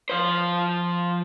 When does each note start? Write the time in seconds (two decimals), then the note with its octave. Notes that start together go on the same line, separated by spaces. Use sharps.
0.09 F3 C5